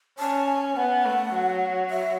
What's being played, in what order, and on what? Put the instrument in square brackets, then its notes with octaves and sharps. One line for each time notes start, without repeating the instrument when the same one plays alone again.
[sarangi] C#4 [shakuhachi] A5
[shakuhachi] G#5
[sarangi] B3 [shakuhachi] F#5
[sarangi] A3
F#3
[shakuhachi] E5